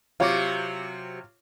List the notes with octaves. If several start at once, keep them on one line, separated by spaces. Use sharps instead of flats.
C3 F#3 F4 C#5 D6